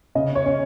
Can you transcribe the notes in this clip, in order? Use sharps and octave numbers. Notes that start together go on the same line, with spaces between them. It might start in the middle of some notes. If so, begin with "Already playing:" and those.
C#3 D#5
C#5
C#4